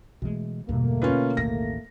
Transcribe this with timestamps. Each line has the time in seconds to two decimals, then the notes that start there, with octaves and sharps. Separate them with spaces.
0.22 B2 E3 G#3 A3
0.69 E2 G2 B2 D3 A3 A#3
1.02 C#4 F4 B4
1.37 A1 D#2 A2 A#6